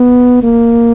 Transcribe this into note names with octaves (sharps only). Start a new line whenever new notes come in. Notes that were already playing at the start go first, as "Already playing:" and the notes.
Already playing: B3
A#3